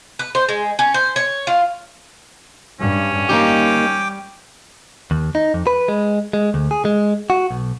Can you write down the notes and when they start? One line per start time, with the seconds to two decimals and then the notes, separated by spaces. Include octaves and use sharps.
0.19 B4
0.35 C5
0.49 G#3
0.79 C#4
0.94 C5
1.16 C#5
1.47 F4
2.80 G2 C#4
3.29 G3 A#3 D#4 G4 G5 D6
5.11 D#2
5.35 D#4
5.54 F2
5.67 B4
5.88 G#3
6.33 G#3
6.54 D2
6.71 G#4
6.85 G#3
7.30 F#4
7.51 B1